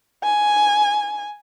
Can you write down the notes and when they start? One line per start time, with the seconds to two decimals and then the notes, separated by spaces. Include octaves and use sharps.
0.24 G#5